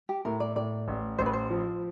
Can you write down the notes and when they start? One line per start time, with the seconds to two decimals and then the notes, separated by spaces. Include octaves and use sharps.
0.09 G4
0.25 A2 A#4
0.40 D5
0.56 A2 D5
0.88 A1
1.18 A1 C5
1.26 B4
1.33 C5
1.50 F3